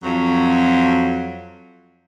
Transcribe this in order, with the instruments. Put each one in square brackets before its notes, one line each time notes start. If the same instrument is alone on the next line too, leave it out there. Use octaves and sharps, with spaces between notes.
[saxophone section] F2 F#3